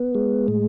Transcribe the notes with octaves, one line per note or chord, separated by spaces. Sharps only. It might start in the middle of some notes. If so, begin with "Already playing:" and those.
Already playing: B3
G#3
A2